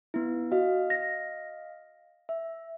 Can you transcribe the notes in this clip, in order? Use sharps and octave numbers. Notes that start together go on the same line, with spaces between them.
B3 E4
F#4 D#5 F5
A#6
E5